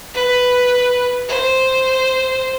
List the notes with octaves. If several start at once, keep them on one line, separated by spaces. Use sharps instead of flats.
B4
C5